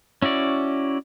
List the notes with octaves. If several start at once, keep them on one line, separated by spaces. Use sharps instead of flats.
C#4 E4 F#4 D5